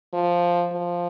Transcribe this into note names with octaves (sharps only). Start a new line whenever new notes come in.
F3
F3